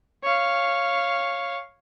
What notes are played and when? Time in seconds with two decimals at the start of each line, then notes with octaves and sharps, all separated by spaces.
0.23 C#5 F5